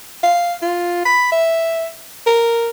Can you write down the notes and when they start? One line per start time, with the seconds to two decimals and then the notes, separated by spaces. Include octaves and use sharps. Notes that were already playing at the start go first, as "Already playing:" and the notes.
0.23 F5
0.62 F4
1.05 B5
1.32 E5
2.26 A#4